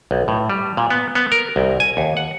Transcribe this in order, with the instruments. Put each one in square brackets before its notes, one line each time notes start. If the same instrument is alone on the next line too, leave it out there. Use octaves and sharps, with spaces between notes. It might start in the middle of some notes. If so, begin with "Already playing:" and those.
[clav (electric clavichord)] B1
A2
G3
A#2
B3
B3
A#4
C2
G#5
D#2
F#5